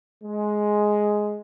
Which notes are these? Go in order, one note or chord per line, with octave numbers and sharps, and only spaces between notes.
G#3